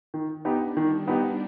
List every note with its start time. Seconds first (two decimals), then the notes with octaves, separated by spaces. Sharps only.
0.14 D#3
0.45 B3 D4 D#4 G4
0.77 D#3 G3
1.08 B3 D#4 G4